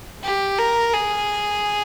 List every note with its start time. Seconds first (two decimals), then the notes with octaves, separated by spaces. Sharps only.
0.24 G4
0.59 A#4
0.94 G#4